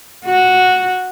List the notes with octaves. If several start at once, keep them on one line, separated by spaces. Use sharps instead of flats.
F#4